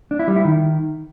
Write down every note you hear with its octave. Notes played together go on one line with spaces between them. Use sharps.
D4
E4
G3
E4
D#3